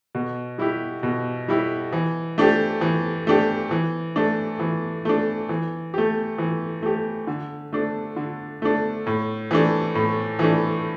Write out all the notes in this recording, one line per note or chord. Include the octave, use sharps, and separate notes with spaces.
B2
G3 E4 G4
B2
G3 E4 G4
E3
A3 D4 G4
E3
A3 D4 G4
E3
A3 D4
E3
A3 D4
E3
A3 G4
E3
A3 G4
D3
A3 D4
D3
A3 D4
A2
E3 A3 D4
A2
E3 A3 D4